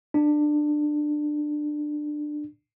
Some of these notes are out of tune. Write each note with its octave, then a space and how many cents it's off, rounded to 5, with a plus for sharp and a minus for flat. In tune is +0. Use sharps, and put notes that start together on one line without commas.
D4 +20